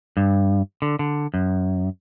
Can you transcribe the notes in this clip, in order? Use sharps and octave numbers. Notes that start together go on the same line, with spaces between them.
G2
D3
D3
F#2